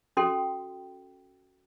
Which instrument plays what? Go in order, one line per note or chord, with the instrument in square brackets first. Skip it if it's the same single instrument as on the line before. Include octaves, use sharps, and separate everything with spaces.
[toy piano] C#4 F#4 A4 G5 C6